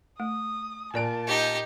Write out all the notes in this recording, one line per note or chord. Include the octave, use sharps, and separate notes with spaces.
A3 D#6
A#2 A#3 A#4 D5 G#5 A5 D7
D#4 G4